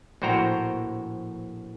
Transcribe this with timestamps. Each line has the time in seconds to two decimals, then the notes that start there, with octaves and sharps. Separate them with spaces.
0.22 A#1 A2 F#4 C5 G5 A#5